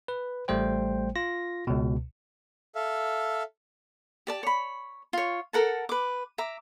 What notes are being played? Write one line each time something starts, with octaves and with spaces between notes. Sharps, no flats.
B4
A1 G3 A3 C5 G5
F4 A#6
C#2 B2
A4 E5 F5
G4 D5 A5
C#5 B5
F4 C#5
A4 A#4 F#5 A5
B4 D6
E5 A#5 D6